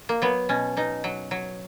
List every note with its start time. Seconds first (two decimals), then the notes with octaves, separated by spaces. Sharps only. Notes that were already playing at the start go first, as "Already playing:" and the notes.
0.09 A#3
0.22 F#3 B3
0.49 B2 C#4
0.77 B2 D#4
1.04 F#3
1.31 F#3